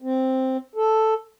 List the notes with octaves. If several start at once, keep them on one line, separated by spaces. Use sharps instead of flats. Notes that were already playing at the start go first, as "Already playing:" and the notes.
C4
A4